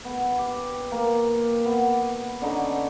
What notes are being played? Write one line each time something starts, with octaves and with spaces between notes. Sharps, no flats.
B3
G4
A#3
B3
D3 C#4 D#4 B5